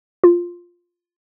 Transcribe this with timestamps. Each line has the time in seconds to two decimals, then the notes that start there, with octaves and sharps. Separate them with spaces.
0.24 F4